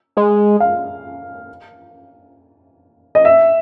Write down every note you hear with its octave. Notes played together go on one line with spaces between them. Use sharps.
G#3
F5
D#5
E5